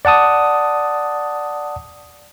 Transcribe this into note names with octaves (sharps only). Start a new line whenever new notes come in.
D5 F#5 A5 D#6